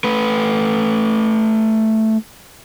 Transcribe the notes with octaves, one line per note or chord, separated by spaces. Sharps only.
A3 B4